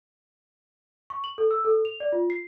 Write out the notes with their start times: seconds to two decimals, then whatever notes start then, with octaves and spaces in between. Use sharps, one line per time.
1.10 C#6
1.24 F#7
1.38 A4
1.51 E6
1.65 A4
1.85 F7
2.00 D5
2.12 F4
2.30 C7